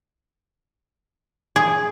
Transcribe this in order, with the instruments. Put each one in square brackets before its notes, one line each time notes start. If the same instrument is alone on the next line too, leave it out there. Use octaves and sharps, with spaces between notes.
[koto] G#4